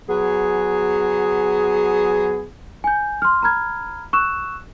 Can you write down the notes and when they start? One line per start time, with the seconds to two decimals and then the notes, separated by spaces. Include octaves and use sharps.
0.08 F#3 B3 G#4
2.84 G#5 G6
3.22 C6 F6
3.42 A#5 B5 F6 G#6
4.13 C#6 E6 F#6 E7